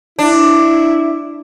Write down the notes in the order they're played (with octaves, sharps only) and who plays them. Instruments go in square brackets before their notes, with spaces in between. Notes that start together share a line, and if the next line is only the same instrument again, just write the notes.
[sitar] D4 [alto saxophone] E4